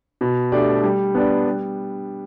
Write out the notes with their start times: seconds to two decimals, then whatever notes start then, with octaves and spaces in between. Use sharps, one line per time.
0.21 B2
0.52 A3 D4 G4 D5
0.84 G3
1.15 B3 D4 B4 D5
1.46 G3